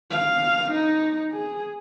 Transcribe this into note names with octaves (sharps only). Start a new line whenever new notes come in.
F5
D#4
G#4